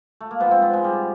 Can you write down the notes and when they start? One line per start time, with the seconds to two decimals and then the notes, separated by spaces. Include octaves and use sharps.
0.21 A3
0.31 A#3
0.40 G#2 F3 B3
0.51 C4
0.62 B3
0.73 G#3
0.84 G3